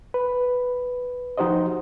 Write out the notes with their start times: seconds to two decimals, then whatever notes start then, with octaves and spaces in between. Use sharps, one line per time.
0.14 B4
1.38 F3 D#4 F#4 G4 C5 D#5